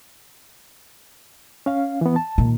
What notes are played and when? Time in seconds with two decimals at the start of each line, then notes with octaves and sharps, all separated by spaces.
1.66 C#4 F5
2.01 E3 B3
2.16 A5
2.38 A#2 D#3